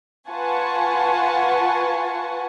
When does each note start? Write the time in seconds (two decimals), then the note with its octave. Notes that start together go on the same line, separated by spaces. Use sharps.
0.28 F4 B4 F#5 G#5 A5 C#6